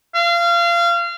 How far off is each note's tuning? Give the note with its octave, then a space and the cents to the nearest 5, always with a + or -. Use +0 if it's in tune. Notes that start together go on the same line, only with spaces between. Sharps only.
F5 -25